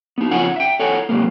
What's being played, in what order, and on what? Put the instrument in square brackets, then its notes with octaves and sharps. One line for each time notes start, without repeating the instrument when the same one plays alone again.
[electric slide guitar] B3 D#4
F2 C#3 F4 C#5 F#5 G#5
E5 G5
A4 C#5 F#5 G#5
C3 F#3 G#3 A#3